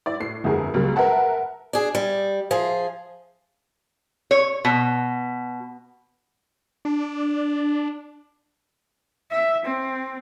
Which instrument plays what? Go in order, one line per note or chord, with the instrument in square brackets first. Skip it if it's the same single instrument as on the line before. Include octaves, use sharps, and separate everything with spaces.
[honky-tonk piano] E4 D5
A2 C7
G1 F2 E4 F#4 G#4 A#4
C#2 F#3 G3 A#3
A#4 B4 E5 F#5 A5
[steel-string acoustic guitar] D4 G#4
G3
F3 G#4
[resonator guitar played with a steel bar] C#5
B2
[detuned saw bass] D4
[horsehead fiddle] E5
C4